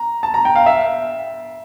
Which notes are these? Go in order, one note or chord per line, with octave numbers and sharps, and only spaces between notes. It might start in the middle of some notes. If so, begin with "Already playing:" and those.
Already playing: A#5
A5
A#5
G5
F5
E5